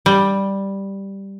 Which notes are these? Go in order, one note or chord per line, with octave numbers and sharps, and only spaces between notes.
G3